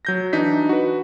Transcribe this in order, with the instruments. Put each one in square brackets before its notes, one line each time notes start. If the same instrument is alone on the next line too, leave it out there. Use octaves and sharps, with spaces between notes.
[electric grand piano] F#3 G6 A#6
E3 D4 D#4 B6
F#4 B4